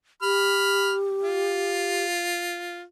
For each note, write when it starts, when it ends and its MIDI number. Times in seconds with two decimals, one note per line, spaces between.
0.22 2.05 67
0.22 0.93 83
0.22 0.93 89
1.24 2.81 65